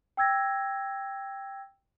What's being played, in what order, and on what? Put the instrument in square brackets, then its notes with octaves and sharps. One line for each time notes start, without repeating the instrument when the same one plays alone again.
[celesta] G5 E6 G#6 A#6